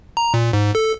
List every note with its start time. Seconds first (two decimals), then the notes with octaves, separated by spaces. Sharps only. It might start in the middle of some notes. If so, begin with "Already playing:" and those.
0.17 A#5
0.34 A#2
0.53 G#2
0.75 A4